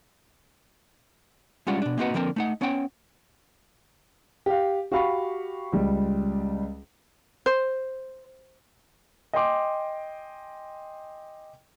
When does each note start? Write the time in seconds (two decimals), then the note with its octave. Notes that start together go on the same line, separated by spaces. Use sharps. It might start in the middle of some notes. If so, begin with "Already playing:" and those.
1.67 G3 G#3 C#4 D4 F4 F#5
1.82 B2 D4
1.98 A#3 C4 D#4 F#4 B4 F#5
2.14 D3 F3 A#3 C4 A#4
2.36 A3 D#4 F#5
2.61 B3 C#4 C#5 F#5 G5
4.46 G4 F5
4.92 F#4 G4 F5 B5 C#6
5.72 C#2 G3
7.46 C5
9.33 D#5 G5 G#5 C6 D6